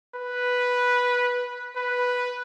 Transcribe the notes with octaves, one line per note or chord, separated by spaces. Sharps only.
B4
B4